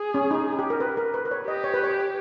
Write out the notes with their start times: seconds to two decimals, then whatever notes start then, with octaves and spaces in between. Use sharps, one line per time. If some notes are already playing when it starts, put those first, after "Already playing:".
Already playing: G#4
0.14 C#4
0.31 D#4
0.59 G4
0.70 A#4
0.80 B4
0.97 A#4
1.14 B4
1.25 B4
1.31 C#5
1.47 G4 D#5
1.64 C#5
1.74 B4
1.83 C#5